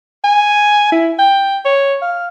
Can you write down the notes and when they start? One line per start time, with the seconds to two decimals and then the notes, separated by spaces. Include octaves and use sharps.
0.24 G#5
0.92 E4
1.19 G5
1.65 C#5
2.02 F5